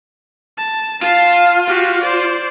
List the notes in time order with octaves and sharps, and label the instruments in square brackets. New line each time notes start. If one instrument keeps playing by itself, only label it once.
[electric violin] A5
[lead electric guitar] F4 [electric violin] A5 C7
[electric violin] F#4 G4
C5 D5